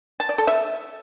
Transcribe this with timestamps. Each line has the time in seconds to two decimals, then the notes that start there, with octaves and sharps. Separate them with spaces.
0.20 A5
0.29 D5
0.38 A4
0.47 E5